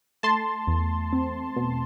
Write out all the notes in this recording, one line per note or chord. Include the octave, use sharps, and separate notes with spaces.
A3 A5 C6
E2
C4
B2